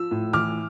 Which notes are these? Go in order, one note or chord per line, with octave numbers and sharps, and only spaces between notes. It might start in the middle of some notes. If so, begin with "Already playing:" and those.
Already playing: F3 E6
A2
E3 D6 F6